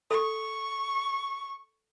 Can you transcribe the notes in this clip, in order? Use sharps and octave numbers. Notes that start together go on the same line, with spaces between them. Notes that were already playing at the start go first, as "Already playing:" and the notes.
A4 C#6